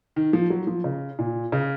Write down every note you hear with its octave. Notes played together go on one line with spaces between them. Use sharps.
D#3
F3
F#3
F3
C#3
A#2
C#3